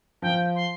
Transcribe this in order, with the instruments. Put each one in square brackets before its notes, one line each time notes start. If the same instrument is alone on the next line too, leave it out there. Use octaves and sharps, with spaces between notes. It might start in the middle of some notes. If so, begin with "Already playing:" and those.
[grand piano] F3 [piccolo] G5
[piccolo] C6